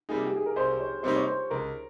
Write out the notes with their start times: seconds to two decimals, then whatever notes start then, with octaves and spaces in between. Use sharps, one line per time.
0.09 C3 G3 A#3 D#4 G#4
0.26 G4
0.36 G#4
0.46 A#4
0.56 C2 C5
0.80 C#5
1.03 C3 G3 A#3 D#4 C5
1.16 C#5
1.27 C5
1.50 C#2 A#4